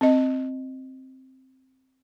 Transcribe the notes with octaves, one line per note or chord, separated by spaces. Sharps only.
C4 D#5